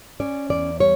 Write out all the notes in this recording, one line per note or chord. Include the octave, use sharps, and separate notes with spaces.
C#4 D5
E2 D5
G3 C#5